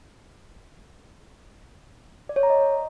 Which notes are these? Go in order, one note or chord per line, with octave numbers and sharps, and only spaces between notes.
D5
C#5
A#5
D#5